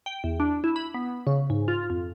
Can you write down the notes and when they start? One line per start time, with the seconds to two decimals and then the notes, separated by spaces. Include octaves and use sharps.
0.06 G5
0.24 E2
0.40 D4
0.64 E4
0.76 B5
0.94 B3
1.27 C#3
1.50 G#2
1.68 F4
1.90 F2